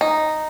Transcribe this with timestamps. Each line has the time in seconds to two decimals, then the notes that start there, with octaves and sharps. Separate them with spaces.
0.01 D#4